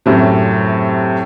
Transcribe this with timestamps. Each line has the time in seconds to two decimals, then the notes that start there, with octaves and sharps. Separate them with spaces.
0.06 F#2 A2 C3